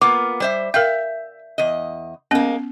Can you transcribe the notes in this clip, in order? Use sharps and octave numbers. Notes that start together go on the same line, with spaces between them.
A#3 B3 F4 D6
G3 C5 E5
A#4 E5 F5 G5 G6
E2 D#5
G#3 A#3 B3 C#4